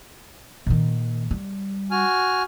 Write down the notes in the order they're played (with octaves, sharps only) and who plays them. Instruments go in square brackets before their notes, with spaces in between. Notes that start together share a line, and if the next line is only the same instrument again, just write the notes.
[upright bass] A#2 D#3
G3
[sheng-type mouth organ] F#4 G#5 F6